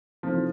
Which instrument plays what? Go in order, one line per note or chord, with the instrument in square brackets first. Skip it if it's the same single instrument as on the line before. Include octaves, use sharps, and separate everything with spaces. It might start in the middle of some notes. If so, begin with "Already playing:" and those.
[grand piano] C3 E3 A3 C4 D#4 [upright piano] F3